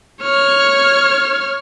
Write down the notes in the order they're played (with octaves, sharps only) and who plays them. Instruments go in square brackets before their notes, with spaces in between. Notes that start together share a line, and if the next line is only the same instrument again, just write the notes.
[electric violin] C#5 F6